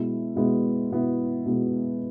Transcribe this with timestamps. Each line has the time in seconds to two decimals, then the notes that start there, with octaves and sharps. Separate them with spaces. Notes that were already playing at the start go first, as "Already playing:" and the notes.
Already playing: B2 G#3 B3 E4
0.35 B2 G#3 B3 E4
0.91 B2 G#3 B3 E4
1.45 B2 G#3 B3 E4